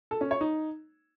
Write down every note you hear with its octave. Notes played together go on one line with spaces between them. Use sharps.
A4
C#4
C#5
D#4